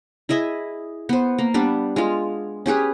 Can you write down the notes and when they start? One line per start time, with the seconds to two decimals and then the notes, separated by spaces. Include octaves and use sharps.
0.29 E4 G#4 D#5 E5
1.09 B3 C5
1.39 A#3
1.54 G3 B3 D4
1.96 G#3 F4
2.66 C#4 G4 G#4 B4